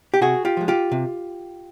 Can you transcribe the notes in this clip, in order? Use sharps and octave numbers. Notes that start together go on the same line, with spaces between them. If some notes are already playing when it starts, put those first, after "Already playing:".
G4
C3 F#4 G#4
F4 G4
F3 G#3
F4 G4
C3